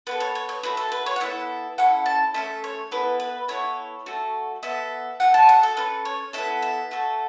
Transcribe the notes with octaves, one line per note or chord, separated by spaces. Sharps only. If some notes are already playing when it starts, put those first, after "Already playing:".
B3 F#4 A4 B4
C#5
C#5
C#5
A3 F#4 A4 B4
A4
B4
C#5
F#5
B3 E4 A4 E5
C#4 E4 A4 F#5
A5
A3 C#4 A4 E5
C#5
B3 E4 A4 B4
B4
B3 E4 A4 C#5
A3 F#4 A4
B3 A4 E5
A3 F#4 A4 F#5
A5
F#5
A4
C#4 A4 B4
C#5
B3 E4 A4 E5
E5
A3 F#4 A4